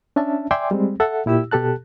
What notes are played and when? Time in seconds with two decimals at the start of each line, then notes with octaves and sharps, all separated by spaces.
0.16 C#4 D4 E5 A5
0.51 D5 E5 G5 G#5 C6 D6
0.71 G3 G#3 C4
1.00 A4 E5 F#5
1.26 A#2 E4 G4 E6
1.51 B2 G4 A4 A5 F#6